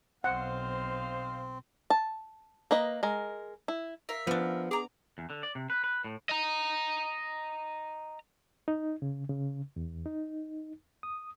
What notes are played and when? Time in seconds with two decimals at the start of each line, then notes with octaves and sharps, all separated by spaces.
0.24 B1 C4 C5 D#5 F5 F#5
1.90 A5
2.71 A#3 B4 D#5
3.03 G#3 A#4
3.68 E4
4.09 A#4 E5 F5
4.27 F3 B3 D4
4.71 G#4 A#5 D6
5.18 E2
5.30 D3
5.43 D5
5.55 C3
5.70 B4
5.84 B4
6.04 A2
6.29 D#5 A#5
8.68 D#4
9.02 C#3
9.29 C#3
9.76 E2
10.06 D#4
11.03 D#6